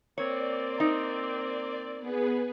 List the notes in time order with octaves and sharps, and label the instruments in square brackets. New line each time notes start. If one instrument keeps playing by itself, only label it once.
[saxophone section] A#3 C4 [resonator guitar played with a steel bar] C#5 [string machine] D5
[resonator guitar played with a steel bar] D#4
[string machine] B3 G#4 B4